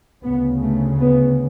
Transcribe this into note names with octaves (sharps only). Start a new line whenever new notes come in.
D2 C#3 B3
A3
B3